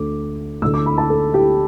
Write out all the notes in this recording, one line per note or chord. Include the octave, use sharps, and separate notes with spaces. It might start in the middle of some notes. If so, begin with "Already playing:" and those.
Already playing: D2 D3 D6
D2 D3 E6
D6
B5
A5
A4
G4